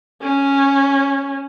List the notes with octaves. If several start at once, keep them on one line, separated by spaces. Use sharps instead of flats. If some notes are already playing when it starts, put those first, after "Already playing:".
C#4